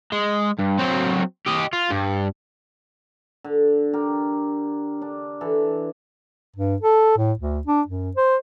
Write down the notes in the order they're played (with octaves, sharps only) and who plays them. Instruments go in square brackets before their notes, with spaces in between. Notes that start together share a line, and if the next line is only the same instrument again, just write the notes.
[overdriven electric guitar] G#3
G2
F#3 C4
G4 D#5
F4
G2
[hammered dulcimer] D3
G4 A#4
D4
E3 A4
[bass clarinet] G2
A4
A2
D2
D4
F#2
C5